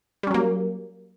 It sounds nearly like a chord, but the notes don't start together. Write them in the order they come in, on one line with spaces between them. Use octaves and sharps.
G3 C#4 F#3 A#3